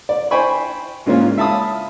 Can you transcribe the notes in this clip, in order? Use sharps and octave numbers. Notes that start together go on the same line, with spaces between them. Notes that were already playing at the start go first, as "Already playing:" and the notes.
D5
C5 G5 G#5 B5 C#6
G#2 C#3 A#3 C#4 F4
E5 F5 A5 B5 D#6